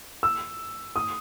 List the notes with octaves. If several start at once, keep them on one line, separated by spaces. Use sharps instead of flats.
E6
D#6